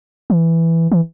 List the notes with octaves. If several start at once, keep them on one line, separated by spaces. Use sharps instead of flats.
E3
E3